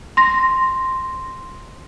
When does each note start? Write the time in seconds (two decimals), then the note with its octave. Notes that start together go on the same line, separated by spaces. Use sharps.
0.17 C6 A#6